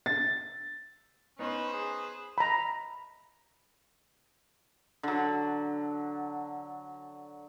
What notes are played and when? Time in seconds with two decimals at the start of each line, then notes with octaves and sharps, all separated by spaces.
0.06 A6
1.39 B3 C#4 D#4 B4 C5
1.73 G#4
2.38 A#5 B5
5.03 D3 F#3